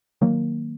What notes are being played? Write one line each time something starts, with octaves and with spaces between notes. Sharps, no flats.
D#3 F#3 A#3